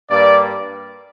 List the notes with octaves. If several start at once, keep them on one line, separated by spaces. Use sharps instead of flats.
G2 G3 A#3 D5